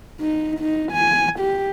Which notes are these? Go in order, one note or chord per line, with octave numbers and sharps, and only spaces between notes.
D#4
D#4
G#5
G4